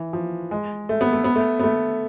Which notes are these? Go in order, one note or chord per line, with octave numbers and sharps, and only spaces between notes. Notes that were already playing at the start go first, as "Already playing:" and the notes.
Already playing: E3
F3
G#3
A3
B3
A3
B3
A3
B3
A3